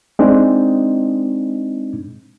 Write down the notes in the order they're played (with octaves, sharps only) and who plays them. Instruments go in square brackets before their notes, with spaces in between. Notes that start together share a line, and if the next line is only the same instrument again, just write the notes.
[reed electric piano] G#3 C4 D4 D#4